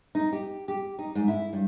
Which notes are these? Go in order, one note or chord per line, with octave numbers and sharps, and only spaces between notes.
D#4
G4
G4
D#4
G#2
E4
G2